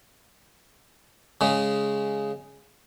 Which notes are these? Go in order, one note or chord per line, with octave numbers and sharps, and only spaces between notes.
C#3 G#3